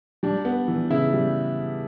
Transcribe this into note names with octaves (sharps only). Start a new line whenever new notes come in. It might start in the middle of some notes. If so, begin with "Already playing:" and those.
G3 D4
B3
E3
C#3 E4
G3